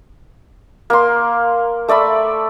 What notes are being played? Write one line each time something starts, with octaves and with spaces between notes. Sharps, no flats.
A#3 C6
A3 D5 E5 B5